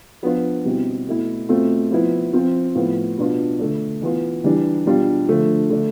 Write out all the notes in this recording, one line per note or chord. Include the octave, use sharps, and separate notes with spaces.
F3 B3 D4 F4
B2 G3 C4 E4
B2 A3 E4
B2 A3 C4 F4
F3 B3 E4
F3 C4 F4
A2 F3 B3 F4
B2 B3 D4 F4
D3 A3 D4
E3 B3 F4
E3 G3 D4
B2 G3 D4 F4
D3 F3 A3
D3 A3 D4